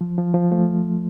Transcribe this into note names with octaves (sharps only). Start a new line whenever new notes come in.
F3
F3
F3
F3 A3